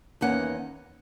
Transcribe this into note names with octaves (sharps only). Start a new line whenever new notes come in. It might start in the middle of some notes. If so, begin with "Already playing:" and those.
E2 D#3 A#3 C#4 F#5